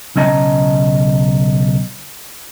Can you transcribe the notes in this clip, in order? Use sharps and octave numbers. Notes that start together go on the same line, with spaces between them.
B1 C#3 C#4 D#5 A5 A#5